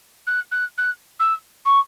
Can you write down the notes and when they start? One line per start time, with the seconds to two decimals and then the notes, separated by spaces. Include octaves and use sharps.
0.27 F#6
0.52 F#6
0.78 F#6
1.20 E6
1.65 C#6